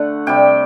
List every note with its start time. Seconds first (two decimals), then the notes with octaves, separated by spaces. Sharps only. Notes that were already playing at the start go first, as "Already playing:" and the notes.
Already playing: D3 A3 F#5
0.27 C3 G3 G5